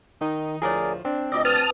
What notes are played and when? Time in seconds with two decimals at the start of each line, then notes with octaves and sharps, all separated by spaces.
0.21 D#3 D#4
0.62 D2 A2 F3 E4 G#4 A#4 C#5 D5
1.05 C4 D4
1.32 D2 C3 F4 D5 D#5 D6 E6
1.45 B4 A5 D#6 F6